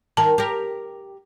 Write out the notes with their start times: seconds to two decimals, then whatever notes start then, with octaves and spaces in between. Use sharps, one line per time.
0.17 D#3 A#4 A5
0.38 G4 A#4